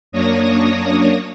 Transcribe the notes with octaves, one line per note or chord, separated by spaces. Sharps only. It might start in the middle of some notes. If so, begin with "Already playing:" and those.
F#2 A#3 D4 C#5 D#6 A#6